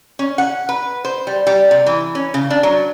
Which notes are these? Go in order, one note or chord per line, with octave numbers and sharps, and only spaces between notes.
C#4
F#5
B4
C5
G3
G3
C3
E3
C#4
C#3
D4
F#3